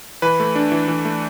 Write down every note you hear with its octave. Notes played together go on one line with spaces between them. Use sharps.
E3 B4
A3
D4
E3
E3
A3